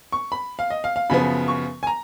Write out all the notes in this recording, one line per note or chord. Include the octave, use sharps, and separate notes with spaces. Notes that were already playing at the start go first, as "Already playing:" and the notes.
C#6
B5
F5
D#5
F5
F5
F#2 C#3 F3 B3 B5
C#6
G#5
A#5